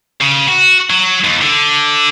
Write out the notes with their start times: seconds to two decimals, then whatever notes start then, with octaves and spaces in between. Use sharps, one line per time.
0.21 C#3
0.48 F#4
0.90 F#3
1.24 D#2
1.42 D3